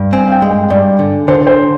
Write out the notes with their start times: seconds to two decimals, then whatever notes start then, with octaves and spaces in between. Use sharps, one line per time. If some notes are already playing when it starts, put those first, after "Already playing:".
Already playing: G2
0.13 C4 G#5
0.28 F5
0.32 G5
0.42 G#3
0.51 G5
0.70 G2 D5
0.99 D3
1.28 D3 C5
1.47 C5